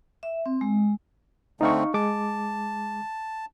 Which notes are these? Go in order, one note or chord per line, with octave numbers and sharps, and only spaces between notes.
E5
C4
G#3
D3 A3 C4 D#4 F5 C#6
G#3 A5 D6